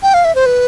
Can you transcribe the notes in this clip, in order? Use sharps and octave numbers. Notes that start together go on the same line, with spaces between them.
G5
F5
E5
C5
B4